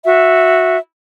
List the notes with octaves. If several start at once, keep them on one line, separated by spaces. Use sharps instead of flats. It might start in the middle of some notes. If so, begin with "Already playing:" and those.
F#4 E5